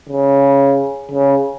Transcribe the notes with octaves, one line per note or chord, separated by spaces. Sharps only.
C#3
C#3